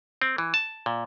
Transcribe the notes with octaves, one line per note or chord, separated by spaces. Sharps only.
C4
E3
A5
A#2